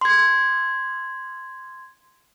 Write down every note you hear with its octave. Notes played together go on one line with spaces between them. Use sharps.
C6 G#6